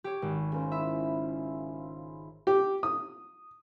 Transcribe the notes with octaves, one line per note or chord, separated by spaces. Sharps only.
G4 C#5
G#1
C#3 A#4 C5
E4 F4 E5
G4
D#6